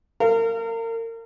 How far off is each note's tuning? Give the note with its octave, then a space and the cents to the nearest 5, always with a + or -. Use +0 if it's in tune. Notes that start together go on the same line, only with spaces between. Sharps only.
A#4 -35 F5 -20